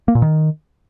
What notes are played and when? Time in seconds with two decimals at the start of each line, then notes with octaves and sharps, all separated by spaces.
0.08 A#3
0.15 A#2
0.22 D#3